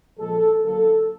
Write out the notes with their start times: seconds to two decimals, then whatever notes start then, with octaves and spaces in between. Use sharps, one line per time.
0.18 A#2 F3 G#3 A4
0.64 D3 F#3 A#3 A4